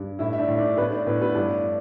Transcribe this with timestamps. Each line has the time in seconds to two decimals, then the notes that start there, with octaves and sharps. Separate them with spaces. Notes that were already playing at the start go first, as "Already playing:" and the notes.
Already playing: G2
0.19 A2 E4 E5
0.33 E5
0.38 D4 D5
0.48 A2 E5
0.59 D4 D5
0.77 A2 B3 B4
0.92 D4 D5
1.06 A2 B3 B4
1.21 B3 B4
1.35 G2 D4 D5